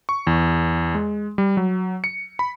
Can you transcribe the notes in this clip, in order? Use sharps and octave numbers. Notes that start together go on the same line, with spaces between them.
C#6
E2
G#3
G3
F#3
C#7
B5